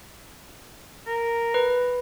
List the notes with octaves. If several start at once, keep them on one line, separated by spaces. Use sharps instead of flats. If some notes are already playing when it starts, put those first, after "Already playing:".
A#4
B4